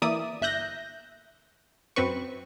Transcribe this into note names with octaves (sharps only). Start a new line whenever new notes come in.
E3 A#3 D5 E5 D#6
G1 E5 F#6 G6 A#6
F#2 C4 B4 C#6